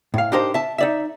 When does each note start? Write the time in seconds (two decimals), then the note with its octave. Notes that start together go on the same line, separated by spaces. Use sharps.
0.14 A2 F5
0.32 D4 D#4 G4 A#4 C5
0.54 E5 A5
0.78 D#4 D5 E5